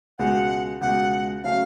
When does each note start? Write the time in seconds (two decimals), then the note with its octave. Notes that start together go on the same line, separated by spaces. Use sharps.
0.19 C#2 B2 G#3 F#5
0.81 C#2 B2 G#3 F#5
1.44 C#3 F#3 A3 F5